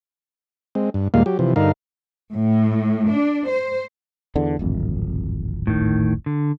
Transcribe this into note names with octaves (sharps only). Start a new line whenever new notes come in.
G#3 C4
G2
D#2 A#2 G3 G#3 A#3 F5
F#3 G4
C3 E3 F3
G2 D3 D#4 A#4 F5
A2
D4
C5
E2 D3
D1 G#1 F2
A2 D#3
D3